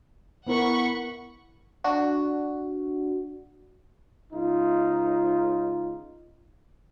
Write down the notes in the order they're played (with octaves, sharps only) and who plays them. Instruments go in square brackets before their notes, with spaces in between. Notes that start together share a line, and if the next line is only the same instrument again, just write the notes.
[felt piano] B3 E4 A#4 [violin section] F#5 B5 C#6
[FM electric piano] D4 F#4
[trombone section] C#2 D#4 F4